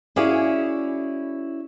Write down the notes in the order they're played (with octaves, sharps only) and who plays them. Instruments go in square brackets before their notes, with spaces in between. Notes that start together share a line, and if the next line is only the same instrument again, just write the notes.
[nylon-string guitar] C#4 E4 F#4 G#4 D5 F5